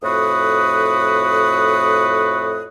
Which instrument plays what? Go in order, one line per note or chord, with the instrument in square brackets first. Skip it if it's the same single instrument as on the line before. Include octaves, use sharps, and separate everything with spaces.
[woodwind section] F2 A2 F#4 B4 D#6